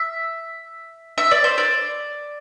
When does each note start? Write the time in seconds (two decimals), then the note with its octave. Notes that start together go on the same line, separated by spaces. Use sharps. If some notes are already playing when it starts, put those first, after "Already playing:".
Already playing: E5
1.18 E5
1.31 D5
1.44 C5
1.58 D5